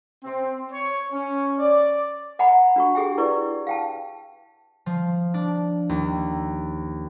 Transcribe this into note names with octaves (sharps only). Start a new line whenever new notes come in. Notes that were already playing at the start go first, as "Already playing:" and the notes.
C4
C#5
C#4
D5
D#5 F#5 G#5 A#5 B5
D4 F#4 C#6
G4 G#4 E5 G5
E4 B4 D5 C#6
F5 G5 A5
F3
D4
D#2